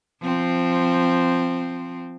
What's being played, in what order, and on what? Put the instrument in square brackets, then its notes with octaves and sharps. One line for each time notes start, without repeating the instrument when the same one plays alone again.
[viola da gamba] F3 C4